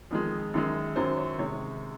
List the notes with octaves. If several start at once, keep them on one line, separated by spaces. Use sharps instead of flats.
F2 D#3 G#3
F#2 D#3 G#3
F#2 D#3 F#3 C5
C#5
C3 D#3 G#3 C#5